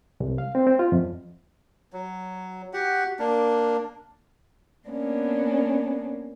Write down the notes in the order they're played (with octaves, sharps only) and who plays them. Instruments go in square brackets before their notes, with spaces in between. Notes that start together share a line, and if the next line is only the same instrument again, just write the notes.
[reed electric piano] C2
F5
C4
C4
F4
F2
[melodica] F#3
F#4 G4 F#5
A#3 D4
[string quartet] A#3 B3 C#4 D4